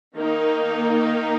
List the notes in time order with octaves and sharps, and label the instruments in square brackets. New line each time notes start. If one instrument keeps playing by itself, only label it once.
[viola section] D#3 A#3 D#4